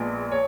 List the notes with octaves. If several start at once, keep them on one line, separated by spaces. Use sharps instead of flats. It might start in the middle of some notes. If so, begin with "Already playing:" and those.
Already playing: A#1 A#2 G#3 B3
C#5